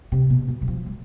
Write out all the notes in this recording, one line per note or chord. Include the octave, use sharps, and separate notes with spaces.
C3
B2
B2
E3
F3
G#3